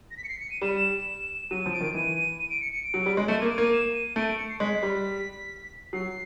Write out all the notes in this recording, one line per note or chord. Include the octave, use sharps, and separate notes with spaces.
A#6
B6
C#7
C7
C#7
D#7
G3 E7
F#3 D#7
F3
D7
D#3
E3 D#7
D#7
D7
C#7
C#7
D7
F#3
G3
G#3
A3 E7
A#3 D#7
D7
A#3 D#7
E7
D#7
A3 D7
D7
C#7
C7
G#3 B6
G3
F#3 C7